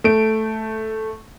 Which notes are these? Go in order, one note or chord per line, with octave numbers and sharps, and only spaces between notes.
A3 D7